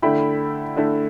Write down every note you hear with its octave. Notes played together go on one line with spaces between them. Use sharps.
D3 A3 E4 G5 B5
D3 A3 E4